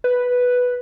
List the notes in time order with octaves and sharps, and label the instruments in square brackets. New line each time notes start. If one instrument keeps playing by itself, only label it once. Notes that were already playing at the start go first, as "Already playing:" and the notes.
[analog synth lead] B4